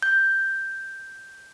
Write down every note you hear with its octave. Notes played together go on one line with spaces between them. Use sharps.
G6